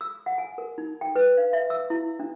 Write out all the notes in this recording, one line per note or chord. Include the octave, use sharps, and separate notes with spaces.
E6
F#5
G#5
A#4
D#4
G5
B4
F5
E5
E6
E4
D4